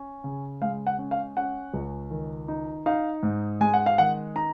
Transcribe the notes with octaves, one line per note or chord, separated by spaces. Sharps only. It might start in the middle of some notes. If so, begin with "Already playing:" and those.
Already playing: C#4
C#3
G#3 F5
F#5
C#4
F5
C#4 F#5
C#2
D#3
D#4
D#4 F5
G#2
G#3 G#5
F#5
F5
D#3 F#5
D#4 A#5